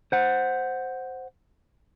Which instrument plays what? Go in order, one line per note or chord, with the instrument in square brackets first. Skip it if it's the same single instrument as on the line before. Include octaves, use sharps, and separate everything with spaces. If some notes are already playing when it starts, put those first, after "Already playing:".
[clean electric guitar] C5 F#5